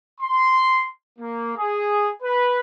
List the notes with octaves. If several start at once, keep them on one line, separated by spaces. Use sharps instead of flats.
C6
A#3
G#4
B4